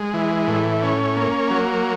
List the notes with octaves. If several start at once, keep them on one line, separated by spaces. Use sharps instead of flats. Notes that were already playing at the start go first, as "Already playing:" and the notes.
Already playing: G#3
E3
A2
C#4
A#3
F#3